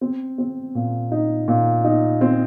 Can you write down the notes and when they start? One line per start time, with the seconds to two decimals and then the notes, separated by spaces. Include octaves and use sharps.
0.01 C4
0.38 C4
0.75 A#2
1.12 D#4
1.48 A#2
1.84 D#4
2.21 C4